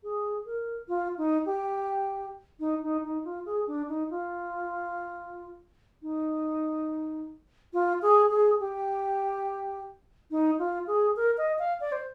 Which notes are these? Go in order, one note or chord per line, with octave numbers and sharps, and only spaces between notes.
G#4
A#4
F4
D#4
G4
D#4
D#4
D#4
F4
G#4
D4
D#4
F4
D#4
F4
G#4
G#4
G4
D#4
F4
G#4
A#4
D#5
F5
D5
C5